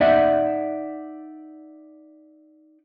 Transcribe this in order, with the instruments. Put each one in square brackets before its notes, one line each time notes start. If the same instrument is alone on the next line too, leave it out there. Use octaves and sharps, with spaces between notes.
[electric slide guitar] D#4 D5 E5 F#5